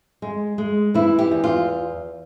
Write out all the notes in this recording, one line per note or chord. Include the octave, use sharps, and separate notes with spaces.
G#3
G#3
E3 E4
G4
E2
F4